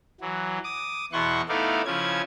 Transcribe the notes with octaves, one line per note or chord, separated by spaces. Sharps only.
E3 F#3
D6 D#6
E2 B2 E4 F#5 C6 C#6
A3 B3 D#4 E4 D5 F5
C#3 F3 C#4 E4 G#6